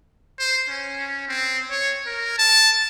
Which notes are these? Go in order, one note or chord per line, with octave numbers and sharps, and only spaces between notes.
C5
C#4
C4
C#5
A#4
A5